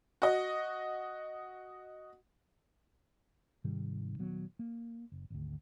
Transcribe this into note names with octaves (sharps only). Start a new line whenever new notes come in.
F#4 D#5
G#2 C3 D#3 G3
D#1 D#2 F#3 B3
A#3
F#1
G#1 D2